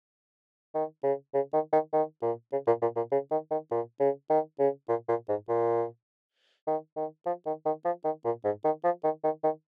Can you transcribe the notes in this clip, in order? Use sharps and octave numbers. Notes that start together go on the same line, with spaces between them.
D#3
C#3
C#3
D#3
D#3
D#3
A#2
C#3
A#2
A#2
A#2
C#3
D#3
D#3
A#2
C#3
D#3
C#3
A#2
A#2
G#2
A#2
D#3
D#3
F3
D#3
D#3
F3
D#3
A#2
G#2
D#3
F3
D#3
D#3
D#3